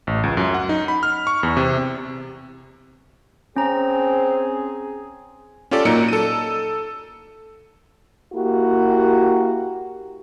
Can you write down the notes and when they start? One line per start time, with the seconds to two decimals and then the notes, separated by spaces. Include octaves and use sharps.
0.07 A1
0.23 C#2
0.37 F#2
0.54 F#5
0.69 D#4
0.88 B5
1.03 F6
1.27 C#6
1.43 E2
1.57 C3
3.56 C4 C#4 G#4 A#5
5.71 C#4 F4 G4 A4 D5
5.85 A#2 F#3 A#3 D#4 C#7 D7
6.09 A4 D#7
8.34 A#3 E4 F#4 G4